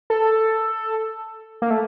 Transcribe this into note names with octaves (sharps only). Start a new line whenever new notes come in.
A4
A#3
A3